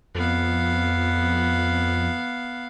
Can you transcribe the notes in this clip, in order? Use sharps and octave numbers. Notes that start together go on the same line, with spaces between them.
F2 B3 F5